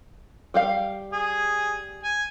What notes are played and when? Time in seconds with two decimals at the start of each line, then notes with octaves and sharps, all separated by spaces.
0.54 G3 G4 F5
1.13 G#4
2.03 G#5